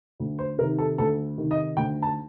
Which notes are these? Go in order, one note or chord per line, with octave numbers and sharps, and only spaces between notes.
D2
C5
C3 D#3 A#4
A4
D2 A4
C3 D#3
D#5
D2 G5
A5